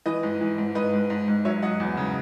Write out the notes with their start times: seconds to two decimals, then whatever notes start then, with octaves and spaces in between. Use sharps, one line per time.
0.06 E3 B4 D#5
0.23 G#2
0.41 E3
0.58 G#2
0.75 G#2 B4 D#5
0.93 G#2
1.10 G#2
1.28 G#2
1.45 F#3 C#5 E5
1.62 F#3 D#5 F#5
1.80 E2
1.97 C#3